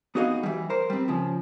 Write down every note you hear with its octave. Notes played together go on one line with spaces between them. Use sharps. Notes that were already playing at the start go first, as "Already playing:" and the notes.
B3 D#4 F#4 G#4 D#5 F5
E3 G3
A#4 C5
G3 C4
C#3 F3